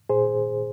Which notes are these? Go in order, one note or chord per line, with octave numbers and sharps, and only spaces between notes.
A#2 G#4 C5